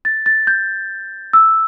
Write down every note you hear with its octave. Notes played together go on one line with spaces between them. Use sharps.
A6
A6
G6
E6